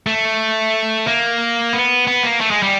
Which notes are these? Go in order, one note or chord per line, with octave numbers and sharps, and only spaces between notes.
A3
A#3
B3
B3
A#3
A3
G#3
G3